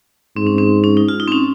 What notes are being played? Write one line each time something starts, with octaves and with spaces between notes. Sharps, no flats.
G#2 C4
C#4
C4
C#4
D#4
F4
D#4
C4
C#4